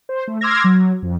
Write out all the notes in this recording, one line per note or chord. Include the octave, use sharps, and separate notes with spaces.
C5
A3
C6 D6 E6 F6 G#6 A#6
F#3
F2